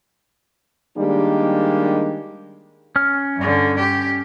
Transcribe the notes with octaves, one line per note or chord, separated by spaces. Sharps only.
D#3 G3 G#3 A#3 D4 G4
C#4 F6
G2 D3
G4